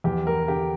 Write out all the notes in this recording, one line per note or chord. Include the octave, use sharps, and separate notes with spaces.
E2 G4
E2 A#4
D3 G4